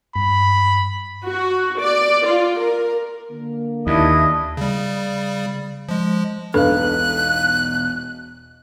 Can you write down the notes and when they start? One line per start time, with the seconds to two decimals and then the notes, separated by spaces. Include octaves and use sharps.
0.16 G2 B5
1.24 F#4
1.80 D5
2.26 F4
2.59 A#4
3.31 D3 A#3
3.87 D#2 D4 E4 D#5
4.57 C#3 G3
5.89 F3 G#3
6.54 E1 B1 D4 A4 B4 F5 F#6